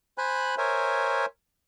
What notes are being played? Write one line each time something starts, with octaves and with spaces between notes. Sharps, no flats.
C5 G#5 B5 F#6
A#4 C5 C#5 E5 G#5